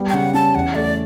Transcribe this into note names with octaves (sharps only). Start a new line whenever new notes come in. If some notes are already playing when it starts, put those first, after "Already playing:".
Already playing: G3 B3
G5
C#3 F#5
C#4 A5
E2 F#5
A3 D5